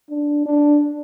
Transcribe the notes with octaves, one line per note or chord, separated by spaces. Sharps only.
D4
D4